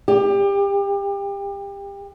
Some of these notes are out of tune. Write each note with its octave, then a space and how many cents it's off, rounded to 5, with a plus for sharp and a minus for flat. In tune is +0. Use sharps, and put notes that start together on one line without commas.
G4 +30